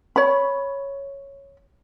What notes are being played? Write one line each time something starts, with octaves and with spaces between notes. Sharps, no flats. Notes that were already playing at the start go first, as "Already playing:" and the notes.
C#5 B5